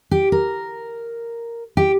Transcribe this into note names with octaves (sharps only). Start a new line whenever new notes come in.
G4
A#4
G4